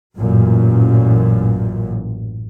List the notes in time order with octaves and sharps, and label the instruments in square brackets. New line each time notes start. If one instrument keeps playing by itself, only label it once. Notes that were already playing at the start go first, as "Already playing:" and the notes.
[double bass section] A1 F#2 A#2